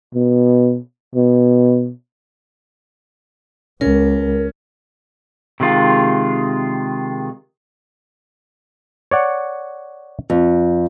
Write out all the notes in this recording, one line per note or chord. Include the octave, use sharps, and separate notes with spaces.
B2
B2
C#2 C#4 A#4
C3 D#3 G#3 F4
C#5 D5 F#5
F2